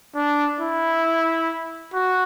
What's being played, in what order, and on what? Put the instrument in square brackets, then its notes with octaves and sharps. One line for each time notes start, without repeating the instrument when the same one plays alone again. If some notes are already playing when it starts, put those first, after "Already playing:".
[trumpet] D4
E4
F#4